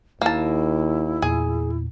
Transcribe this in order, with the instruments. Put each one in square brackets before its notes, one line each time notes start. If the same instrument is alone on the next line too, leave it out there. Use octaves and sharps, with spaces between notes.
[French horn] D#2 [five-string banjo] A#3 A5 [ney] E4
[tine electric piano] E2 A#2 [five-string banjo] G#4